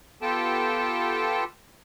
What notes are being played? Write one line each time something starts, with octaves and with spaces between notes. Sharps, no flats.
B3 F4 G4 A4 G5 A5